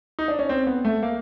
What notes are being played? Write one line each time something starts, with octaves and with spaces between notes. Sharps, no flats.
D#4
D4
C#4
C4
B3
A3
A#3